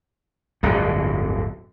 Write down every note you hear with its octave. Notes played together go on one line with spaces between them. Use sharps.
D1 G1 F2 D3